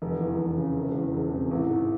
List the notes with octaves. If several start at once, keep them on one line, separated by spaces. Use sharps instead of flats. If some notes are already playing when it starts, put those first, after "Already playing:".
F1
E2
F1
C#3
E1
E2
E1
C3
A1
G#2